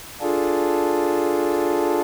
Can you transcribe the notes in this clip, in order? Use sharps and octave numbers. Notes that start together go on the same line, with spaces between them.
D4 F4 G#4 A4